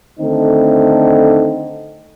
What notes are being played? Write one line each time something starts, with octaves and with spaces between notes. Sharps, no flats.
D3 D#3 A3 C4 D#4 A4